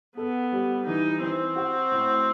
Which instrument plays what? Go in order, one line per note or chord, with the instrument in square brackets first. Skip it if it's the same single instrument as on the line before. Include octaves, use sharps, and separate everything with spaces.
[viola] B3 [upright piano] A4
[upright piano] G3
[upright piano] E3 [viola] D#4
[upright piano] E3 [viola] C4
[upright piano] F#4
A2